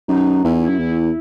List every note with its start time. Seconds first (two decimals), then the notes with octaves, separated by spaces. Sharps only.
0.08 F#2 D#4
0.44 E2 E4
0.61 E4
0.69 F#2
0.79 E2 E4